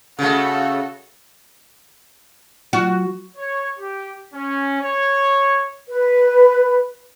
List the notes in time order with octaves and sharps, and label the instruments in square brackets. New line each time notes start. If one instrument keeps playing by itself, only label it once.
[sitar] C#3 A3 [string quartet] F#4 A4
[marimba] F#3 F4 [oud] F#4
[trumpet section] C#5
G4
C#4
C#5
[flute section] B4